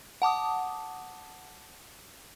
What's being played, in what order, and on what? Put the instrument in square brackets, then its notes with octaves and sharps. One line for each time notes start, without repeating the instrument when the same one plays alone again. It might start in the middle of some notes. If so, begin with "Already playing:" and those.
[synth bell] F#5 A5 D6 D#6